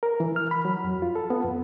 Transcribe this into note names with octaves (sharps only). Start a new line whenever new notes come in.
A#4
E3
F6
B5
F#3
F2
F4
A4
B3
F2